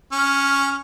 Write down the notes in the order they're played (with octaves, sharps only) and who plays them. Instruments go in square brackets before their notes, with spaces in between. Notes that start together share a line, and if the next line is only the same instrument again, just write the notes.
[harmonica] C#4 F6